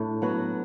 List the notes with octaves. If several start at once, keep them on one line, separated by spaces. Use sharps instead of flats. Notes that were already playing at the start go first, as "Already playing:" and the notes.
Already playing: A2 A3 D4
F#3 B3 F#4